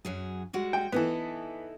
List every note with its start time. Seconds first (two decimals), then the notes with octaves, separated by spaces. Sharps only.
0.05 F#2 F#3 G#4
0.53 G3 G#3 F#4
0.73 G5
0.92 E3 B3 D#4 E4 A4